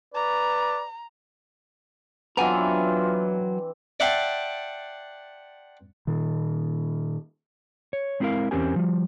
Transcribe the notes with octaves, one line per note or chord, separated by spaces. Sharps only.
B4 D5 A#5
E3 F#3 B3 C4 D4 F4 G#5 A#5
D5 E5 F#5 G5 A5 C6
A#2 D#3
C#5
G#3 C4 E4 G#4 A#4 F5
E2 C4 C#4 G4 A#4 G#5
F3 G3